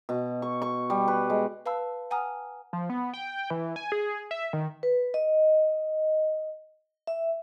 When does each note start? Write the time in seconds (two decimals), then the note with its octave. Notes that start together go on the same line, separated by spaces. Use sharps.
0.09 B2
0.42 C#6
0.62 C#6
0.90 G3
1.08 B4
1.30 G#3
1.66 B4 F5 A5 B5 E6
2.11 F#5 G#5 A#5 D#6 F6
2.73 F3
2.90 B3
3.14 G5
3.50 E3
3.76 G#5
3.92 G#4
4.31 E5
4.53 D#3
4.83 B4
5.14 D#5
7.07 E5